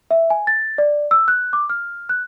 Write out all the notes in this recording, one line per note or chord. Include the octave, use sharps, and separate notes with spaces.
E5
G#5
A6
D5
E6
F#6
D6
F6
F#6